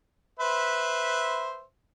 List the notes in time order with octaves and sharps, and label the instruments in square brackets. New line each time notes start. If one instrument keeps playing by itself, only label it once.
[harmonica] B4 C5 E5